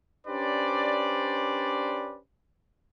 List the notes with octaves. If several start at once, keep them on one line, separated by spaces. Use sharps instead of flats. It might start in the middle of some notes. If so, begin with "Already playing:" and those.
C#4 D4 G4 B4 C5 D5